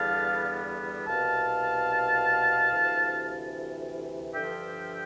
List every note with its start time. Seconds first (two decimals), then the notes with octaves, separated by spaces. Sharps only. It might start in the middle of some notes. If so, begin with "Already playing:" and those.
Already playing: E2 D3 G3 B3 F5 A5
1.07 C2 B2 B3 F5 A5
2.71 D2 C3 E3
4.34 G2 D3 F3 E5 G5